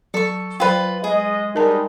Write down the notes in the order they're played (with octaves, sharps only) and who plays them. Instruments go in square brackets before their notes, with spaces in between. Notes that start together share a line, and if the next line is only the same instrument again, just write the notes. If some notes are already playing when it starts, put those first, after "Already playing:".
[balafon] F#3 [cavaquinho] A4 C#6
[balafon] F#3 C5 G5 [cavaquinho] F4 B4
[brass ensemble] G#3 D#5 [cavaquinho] G#4
[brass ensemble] G3 G#3 D#4 [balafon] A#4 A5